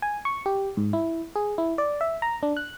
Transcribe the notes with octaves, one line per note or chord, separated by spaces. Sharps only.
G#5
C#6
G4
G#2
E4
G#4
E4
D5
E5
A#5
D4
F#6